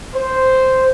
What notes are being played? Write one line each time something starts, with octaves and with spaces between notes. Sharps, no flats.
C5